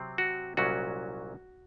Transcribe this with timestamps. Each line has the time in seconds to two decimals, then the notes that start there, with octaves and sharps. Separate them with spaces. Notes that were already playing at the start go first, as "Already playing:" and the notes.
Already playing: C3 F#3 C4
0.18 F#4
0.57 C2 A#2 F#3 C#4 F#4